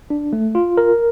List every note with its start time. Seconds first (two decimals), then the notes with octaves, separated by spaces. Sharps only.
0.10 D4
0.33 A3
0.55 F4
0.77 A#4